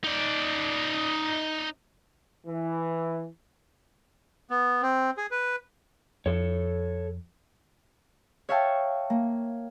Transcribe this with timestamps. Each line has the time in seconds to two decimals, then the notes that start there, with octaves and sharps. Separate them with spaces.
0.04 D#4 D5
2.46 E3
4.50 B3
4.82 C4
5.17 G#4
5.31 B4
6.26 F2 A4 C#5
8.49 C#5 E5 F5 G5 A5
9.10 A#3